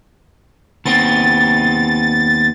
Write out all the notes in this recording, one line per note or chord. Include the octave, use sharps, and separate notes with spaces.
D#2 B3 C4 A6